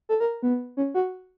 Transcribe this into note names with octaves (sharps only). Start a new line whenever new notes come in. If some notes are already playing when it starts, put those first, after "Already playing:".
A4
A#4
B3
C#4
F#4